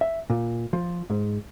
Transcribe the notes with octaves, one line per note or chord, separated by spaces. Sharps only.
E5
A#2
F3
G#2